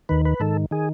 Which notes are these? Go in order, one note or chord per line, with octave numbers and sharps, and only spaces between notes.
D#2 D#3 B4
B4
G#2 D#3 A4
D#3 G#4